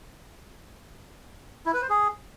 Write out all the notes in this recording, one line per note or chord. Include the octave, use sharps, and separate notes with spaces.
E4
B4
C5
G#4